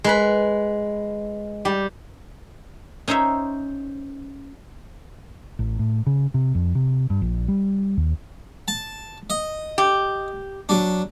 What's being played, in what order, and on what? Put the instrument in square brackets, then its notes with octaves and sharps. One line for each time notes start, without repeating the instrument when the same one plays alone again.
[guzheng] G#3 B4 B5
G3 G4
C#4 D#4 C5 C#5 E5
[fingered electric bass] A1
A2
C#3
C3
F2
C3
G2
A#1
G3
D#2
[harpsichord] A5
D#5
[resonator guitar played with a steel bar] G4
[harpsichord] F#3 D4